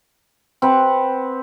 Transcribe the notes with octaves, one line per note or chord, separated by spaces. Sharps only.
C4 B4 F#5